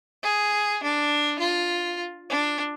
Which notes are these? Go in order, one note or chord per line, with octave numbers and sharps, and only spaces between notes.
G#4
D4
F4
D4